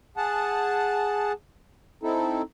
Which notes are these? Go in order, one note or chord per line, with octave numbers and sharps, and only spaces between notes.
G#4 F#5 A5
C4 D#4 E4 A4